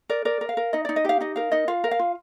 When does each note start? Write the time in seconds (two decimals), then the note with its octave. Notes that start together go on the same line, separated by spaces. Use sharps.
0.09 A#4 D5
0.25 A#4 D5
0.41 A#4
0.49 F5
0.57 A#4
0.73 D#4 D#5
0.85 D#4 D5
0.96 D#5
1.05 G4 F5
1.21 D#4 D#5
1.36 A#4 F5
1.52 D#4 D#5
1.68 F4 F5
1.84 A#4
1.91 F5
1.99 F4